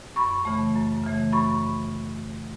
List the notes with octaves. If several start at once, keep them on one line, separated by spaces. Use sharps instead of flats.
F#2 B5 C#6
C#3 E3 A3
F#2
C#3 E3 A3
F#2 B5 C#6